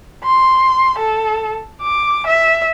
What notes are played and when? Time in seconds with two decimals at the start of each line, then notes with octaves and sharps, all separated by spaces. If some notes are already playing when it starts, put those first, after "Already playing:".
0.24 C6
0.99 A4
1.82 D6
2.27 E5